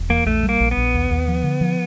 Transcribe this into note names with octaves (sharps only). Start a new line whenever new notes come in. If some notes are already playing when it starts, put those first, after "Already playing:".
Already playing: E1
E2 A#3
A#1 A3
G3
A#3
A#1
B3
A#1
D#2
D#2
F3
D3
F3